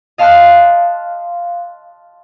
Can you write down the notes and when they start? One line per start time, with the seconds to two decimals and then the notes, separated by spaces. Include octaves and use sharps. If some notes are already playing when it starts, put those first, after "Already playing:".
0.18 D#5 F5 A5 C6 F6 F#6